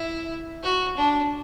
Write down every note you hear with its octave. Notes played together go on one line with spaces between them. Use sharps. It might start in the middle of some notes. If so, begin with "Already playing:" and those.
Already playing: E4
F#4
D4